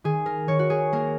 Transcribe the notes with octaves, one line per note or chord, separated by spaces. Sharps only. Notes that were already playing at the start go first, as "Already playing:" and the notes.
D#3 G#4
A#4
D#3 C#5
F#4
G#4
A#3 A#4